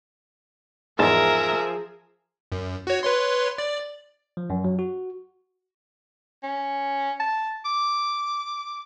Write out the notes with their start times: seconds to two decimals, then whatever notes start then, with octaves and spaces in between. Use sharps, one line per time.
0.99 E2 G#2 F3 G#4 A#4 E5 A5
2.52 F#2
2.87 F#4 C#5
3.03 B4 C#5 C6
3.58 D5
4.37 F3
4.50 F#2
4.64 F#3
4.79 F#4
6.43 C#4
7.20 A5
7.65 D6